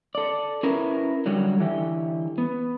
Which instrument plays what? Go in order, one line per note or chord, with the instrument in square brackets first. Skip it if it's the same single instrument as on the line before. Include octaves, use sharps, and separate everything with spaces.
[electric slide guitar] A4 D5
C#4 E4 A#4 B4
D3 F#3 G3
D3 E3 G4
B3